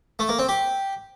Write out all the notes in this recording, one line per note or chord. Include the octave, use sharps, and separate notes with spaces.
A3
A#3
C4
G4